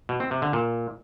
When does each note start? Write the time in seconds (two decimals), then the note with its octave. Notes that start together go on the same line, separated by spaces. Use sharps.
0.09 B2
0.20 C4
0.31 C3
0.42 D3
0.53 A#2